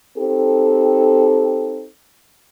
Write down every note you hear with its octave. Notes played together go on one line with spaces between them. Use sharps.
C4 D#4 G4 A4